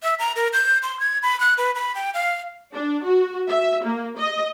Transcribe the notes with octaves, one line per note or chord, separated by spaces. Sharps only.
E5
A#5
A#4
G6
C6
G#6
B5
F#6
B4
B5
G5
F5
D4
F#4
E5
A#3
D#5